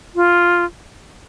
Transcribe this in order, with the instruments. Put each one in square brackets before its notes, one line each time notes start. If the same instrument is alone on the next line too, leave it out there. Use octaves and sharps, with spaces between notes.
[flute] F4